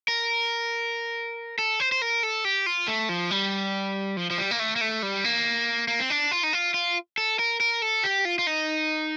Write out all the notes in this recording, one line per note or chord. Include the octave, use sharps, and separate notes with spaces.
A#4
A4
C5
C5
A#4
A4
G4
F4
A3
F3
G3
F3
F3
G3
A#3
A3
A#3
A3
G3
A#3
A#3
C4
D4
F4
D#4
F4
F4
A4
A#4
A#4
A4
G4
F4
F4
D#4